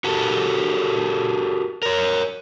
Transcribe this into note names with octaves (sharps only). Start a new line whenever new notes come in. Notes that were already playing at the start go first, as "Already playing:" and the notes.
F#4 G4 A4 A#4
A#4 C#5